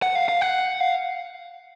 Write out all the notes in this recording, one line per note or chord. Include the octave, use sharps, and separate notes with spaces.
F#5
F5
F5
F#5
F5